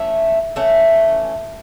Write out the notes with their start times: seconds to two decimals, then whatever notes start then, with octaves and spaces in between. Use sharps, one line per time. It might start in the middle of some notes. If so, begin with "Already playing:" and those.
Already playing: E3 A3 C#4 E5
0.56 E3 A3 C#4